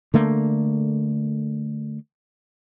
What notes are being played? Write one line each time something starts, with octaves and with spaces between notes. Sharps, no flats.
D3 A3 A#3